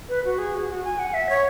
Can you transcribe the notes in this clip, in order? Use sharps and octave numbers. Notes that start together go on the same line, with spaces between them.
B4
F#4
G#4
F#4
F#4
G#5
F#5
E5
C#5